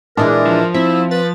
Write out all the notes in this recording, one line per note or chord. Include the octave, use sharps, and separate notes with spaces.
A#2 E3 G#3 D4 E4 A#4
F3
C4 E4 E5
B4 A6